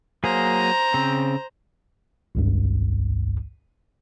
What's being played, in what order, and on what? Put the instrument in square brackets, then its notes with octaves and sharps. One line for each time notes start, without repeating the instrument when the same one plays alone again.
[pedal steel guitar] F#3 A#3 G#4 [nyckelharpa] C5 A#5
[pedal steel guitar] C#3 C4
[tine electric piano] G#1 C#2 G2